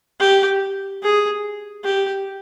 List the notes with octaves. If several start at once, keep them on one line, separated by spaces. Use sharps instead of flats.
G4
G#4
G4